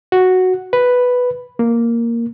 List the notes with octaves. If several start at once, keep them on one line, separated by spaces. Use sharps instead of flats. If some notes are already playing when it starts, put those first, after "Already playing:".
F#4
B4
A#3